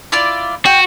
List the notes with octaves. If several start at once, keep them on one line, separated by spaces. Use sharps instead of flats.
E4 F4 D5
F#4 G5